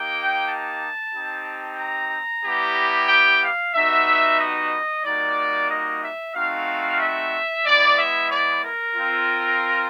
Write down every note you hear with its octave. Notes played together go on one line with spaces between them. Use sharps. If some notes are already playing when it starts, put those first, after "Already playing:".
Already playing: A#3 D#4 G4 G5
A5
C4 D#4 G4
A#5
G3 B3 E4 G4
G5
F5
G3 B3 D#4 F#4 E5
D#5
G3 A#3 D#4 F#4 D5
D#5
E5
A3 C4 D#4 F#4 F5
E5
G#3 B3 E4 D5
E5
D5
A#4
C4 F4